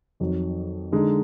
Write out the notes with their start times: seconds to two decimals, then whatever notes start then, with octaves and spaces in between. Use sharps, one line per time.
0.20 F2 D#3 F#3
0.92 D3 G#3 D#4